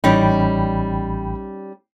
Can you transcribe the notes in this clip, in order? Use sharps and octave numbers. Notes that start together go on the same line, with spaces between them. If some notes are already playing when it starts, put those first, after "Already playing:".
A1 G3 C#4 D#4 G5 B5